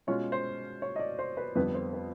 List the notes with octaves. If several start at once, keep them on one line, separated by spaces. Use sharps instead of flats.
B2 G#3 C#4 F4 C#5
C5
C#5
D#5
D5
C5
B4
F2 D3 G3 B3 B4
C5
B4